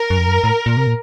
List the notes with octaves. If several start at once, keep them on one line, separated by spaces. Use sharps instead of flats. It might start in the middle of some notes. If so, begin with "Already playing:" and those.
Already playing: A#4
F#2
F2
F#2
A2
A#2
C3
A#2